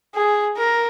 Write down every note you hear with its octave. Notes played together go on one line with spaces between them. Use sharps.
G#4
A#4